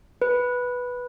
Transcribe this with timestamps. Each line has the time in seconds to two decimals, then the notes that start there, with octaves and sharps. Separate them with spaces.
0.22 B4